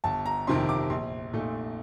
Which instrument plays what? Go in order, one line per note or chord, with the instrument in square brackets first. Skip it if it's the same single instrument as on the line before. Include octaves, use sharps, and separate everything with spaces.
[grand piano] G1 A5
A#5
F2 C3 D#3 C6
D6
A#1 C6
A#2 A3 D#4